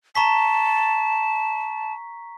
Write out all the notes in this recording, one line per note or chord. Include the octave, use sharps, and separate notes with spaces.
A5 A#5 C#6 B6